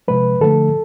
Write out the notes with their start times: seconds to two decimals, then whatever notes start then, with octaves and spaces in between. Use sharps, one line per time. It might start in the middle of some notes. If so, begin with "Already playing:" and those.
0.08 C3 F3 G#3 B4
0.40 D3 F3 A3 A4